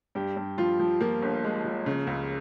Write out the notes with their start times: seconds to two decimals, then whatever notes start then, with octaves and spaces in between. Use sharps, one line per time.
0.15 G2 G4
0.36 G2
0.58 F3 F4
0.79 F3
1.01 F3 A#3
1.22 G1
1.44 G#3
1.65 F3
1.86 C#3
2.07 C#2